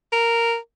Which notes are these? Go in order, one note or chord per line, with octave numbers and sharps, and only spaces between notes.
A#4